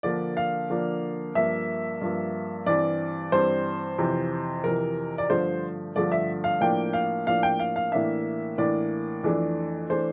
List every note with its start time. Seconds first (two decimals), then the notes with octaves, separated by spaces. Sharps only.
0.03 D3 F3 A#3 D4 D5
0.37 F5
0.70 D3 F3 A#3 D4
1.35 G2 F3 A#3 E5
2.02 G2 F3 A#3
2.66 G2 E3 G3 C4 D5
3.32 G2 E3 G3 C4 C5
3.98 F2 C3 E3
4.64 F2 C3 E3 A#4
5.18 D5
5.29 G2 D3 F3 A3 C5
5.96 G2 D3 F3 A3 D5
6.12 E5
6.44 F5
6.61 A2 F3 A#3 D4 G5
6.93 F5
7.27 A2 F3 A#3 D4 F5
7.43 G5
7.59 F5
7.76 F5
7.92 A2 E3 A#3 D4 E5
8.58 A2 E3 A#3 D4 D5
9.24 F2 E3 A3 D4
9.89 E3 A3 D4 C5